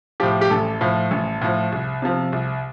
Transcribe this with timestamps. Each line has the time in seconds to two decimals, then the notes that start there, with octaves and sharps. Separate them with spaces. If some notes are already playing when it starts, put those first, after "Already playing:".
0.20 A2 F3 G4
0.41 G4
0.50 A1 A4
0.81 A2 F3
1.11 A1
1.41 A2 F3
1.72 C2
2.02 C3 F3
2.33 C2